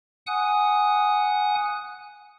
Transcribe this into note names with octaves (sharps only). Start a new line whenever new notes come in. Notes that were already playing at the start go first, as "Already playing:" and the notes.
F#5 G#5 D#6 F#6